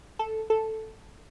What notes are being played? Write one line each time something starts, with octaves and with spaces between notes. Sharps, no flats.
A4
A4